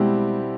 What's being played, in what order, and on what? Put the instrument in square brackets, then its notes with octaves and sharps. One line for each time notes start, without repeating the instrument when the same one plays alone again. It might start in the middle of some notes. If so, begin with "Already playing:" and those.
Already playing: [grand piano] B2 G3 C4 E4 G4 [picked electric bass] G#3